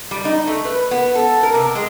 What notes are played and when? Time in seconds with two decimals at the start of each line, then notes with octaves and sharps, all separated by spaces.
0.11 G3
0.25 D#4
0.47 A3
0.65 B4
0.91 B3
1.15 A4
1.43 A#4
1.54 C3
1.75 G#3